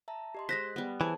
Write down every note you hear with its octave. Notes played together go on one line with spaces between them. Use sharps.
E5 A5 A#5
G4 D#5 C6
G#3 C5 F#6 A#6 B6
G3 B3
E3 G#4 C5 C#5 A5